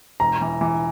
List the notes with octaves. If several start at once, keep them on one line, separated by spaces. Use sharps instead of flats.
E1 A#5
E3
E3